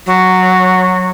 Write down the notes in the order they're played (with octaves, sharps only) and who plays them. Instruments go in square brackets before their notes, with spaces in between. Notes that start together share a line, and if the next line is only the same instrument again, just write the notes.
[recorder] F#3